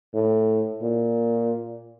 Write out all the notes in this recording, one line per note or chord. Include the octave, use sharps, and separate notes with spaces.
A2
A#2